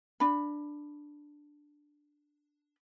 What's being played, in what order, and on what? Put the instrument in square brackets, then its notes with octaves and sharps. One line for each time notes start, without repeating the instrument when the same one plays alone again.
[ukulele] D4 B5